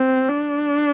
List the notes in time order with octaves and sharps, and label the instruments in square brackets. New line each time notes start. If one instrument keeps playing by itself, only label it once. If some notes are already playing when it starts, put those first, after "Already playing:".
Already playing: [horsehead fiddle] C4
D4